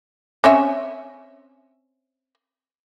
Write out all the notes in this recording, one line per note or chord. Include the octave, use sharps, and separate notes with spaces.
C4 C#4 E5